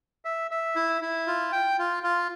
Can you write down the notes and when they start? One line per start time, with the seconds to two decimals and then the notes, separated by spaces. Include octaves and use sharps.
0.25 E5
0.51 E5
0.76 E4
1.02 E4
1.27 F4
1.52 G5
1.79 F4
2.03 F4